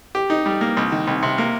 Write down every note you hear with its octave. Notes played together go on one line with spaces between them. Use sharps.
G4
D#4
G3
A#3
C2
D#3
C2
C3
A#3